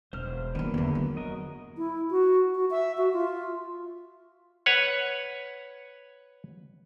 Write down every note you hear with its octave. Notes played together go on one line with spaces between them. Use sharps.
E1 C5 F6
D#3 F#3 A#3 B3 D4
E2 D3
F#3
F#4 A#4 D#5
E4
F#4
F#4
E5
F#4
F4
B4 C#5 F#5